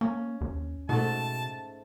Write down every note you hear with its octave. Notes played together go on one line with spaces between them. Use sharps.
A#3 C#4
D#2
G#2 B2 A3 A5